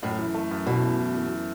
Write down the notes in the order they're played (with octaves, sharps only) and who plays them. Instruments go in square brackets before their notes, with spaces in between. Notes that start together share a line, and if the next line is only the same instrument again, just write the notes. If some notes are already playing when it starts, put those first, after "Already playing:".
[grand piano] F#2 [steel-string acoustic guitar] A2
[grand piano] E3
A3
F#2
[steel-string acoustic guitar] B2 [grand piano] E3
[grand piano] A3
E3
E3